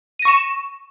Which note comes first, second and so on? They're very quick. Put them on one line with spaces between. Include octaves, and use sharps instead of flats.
D#7 A#6 C#6 E7